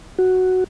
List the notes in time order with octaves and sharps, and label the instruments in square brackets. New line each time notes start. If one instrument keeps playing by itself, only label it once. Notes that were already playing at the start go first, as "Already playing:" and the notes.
[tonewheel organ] F#4